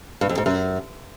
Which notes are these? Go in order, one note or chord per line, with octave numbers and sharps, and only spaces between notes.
G2
F2
G#2
F#2